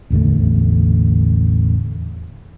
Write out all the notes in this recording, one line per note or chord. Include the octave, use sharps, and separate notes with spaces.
A1 E2 D3 A3